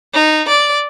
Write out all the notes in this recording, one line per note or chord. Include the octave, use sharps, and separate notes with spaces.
D#4
D5